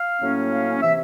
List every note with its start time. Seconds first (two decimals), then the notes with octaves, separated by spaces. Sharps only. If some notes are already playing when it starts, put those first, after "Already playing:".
Already playing: F5
0.21 A2 F#3 A#3 C#4
0.51 F5
0.82 C3 E3 E5